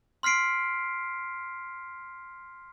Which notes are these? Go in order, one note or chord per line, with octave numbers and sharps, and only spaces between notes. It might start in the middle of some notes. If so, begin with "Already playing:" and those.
C6 F6 B6 C7 D7